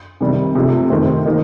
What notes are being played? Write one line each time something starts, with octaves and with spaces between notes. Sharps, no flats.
C3 D#3 G3
C3 F3 A3 D#4 A4
C3 D#3 A3 C4
D#3 A#3 D#4